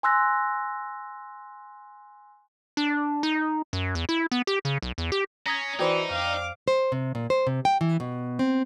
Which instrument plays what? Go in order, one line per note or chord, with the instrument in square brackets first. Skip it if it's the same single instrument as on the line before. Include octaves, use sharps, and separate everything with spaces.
[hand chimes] G#5 C6 E6 F#6 A#6
[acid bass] D4
D#4
F#2
E2
E4
B3
G4
C#3
B1
E2
G4
[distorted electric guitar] C#4 [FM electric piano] A#5 D#6 G#6 [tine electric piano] A#6 B6
[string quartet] E3 [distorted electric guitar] D#4 [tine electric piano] F#4 [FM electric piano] C5 D5 G5
[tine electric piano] F2 [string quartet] F5 D6
[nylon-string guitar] C5
C3
A#2
C5
C3
G5
E3
B2
C4